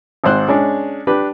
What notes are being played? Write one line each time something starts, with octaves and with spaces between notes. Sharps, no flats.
G#1 G#2 C5 F#6
G#3 C#4 D4
D4 G4 B4